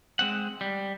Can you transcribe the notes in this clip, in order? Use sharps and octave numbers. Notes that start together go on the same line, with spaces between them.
G#3 C4 F#5
G3